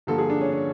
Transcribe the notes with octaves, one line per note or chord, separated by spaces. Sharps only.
G2 D3 F3 A#3 A4
G#4
D4
C#4
C#4